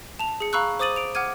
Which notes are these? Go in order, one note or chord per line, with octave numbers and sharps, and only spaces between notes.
A5 F7
G#4 C#7
F5 A#5 B5 C#6 E6 F#6
C5 D6 D#6 A6 D#7 F#7
D7 F7
F#5 D6 F6 G#6 D#7